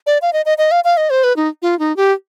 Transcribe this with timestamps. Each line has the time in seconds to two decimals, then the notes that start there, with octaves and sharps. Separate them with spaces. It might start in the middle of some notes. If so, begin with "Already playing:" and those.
0.07 D5
0.22 F5
0.33 D#5
0.46 D#5
0.58 D#5
0.71 F5
0.84 F5
0.97 D#5
1.10 C5
1.24 B4
1.36 D#4
1.62 F4
1.79 D#4
1.97 G4